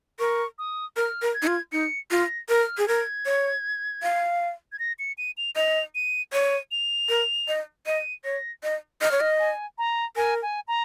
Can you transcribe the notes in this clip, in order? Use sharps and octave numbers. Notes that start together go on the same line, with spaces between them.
A#4 C#6
D#6
A#4 F6
A#4
G#6
D#4
F4
D#4 C#7
F4 A#6
A#4 F6
G#4
A#4 G#6
C#5
F5
G#6
A#6
C#7
D#7
F7
D#5 F7
D#7
C#5 D#7
F7
A#4
D#5
D#5 D#7
C#5 A#6
D#5
D#5 F6
C#5
D#5
G#5
A#5
A#4 G#5
G#5
A#5